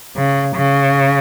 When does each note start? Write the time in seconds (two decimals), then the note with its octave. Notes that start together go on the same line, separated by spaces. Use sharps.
0.16 C#3
0.56 C#3